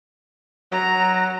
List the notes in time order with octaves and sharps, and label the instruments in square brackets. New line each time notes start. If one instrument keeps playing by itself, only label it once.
[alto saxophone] F#3 [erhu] A#5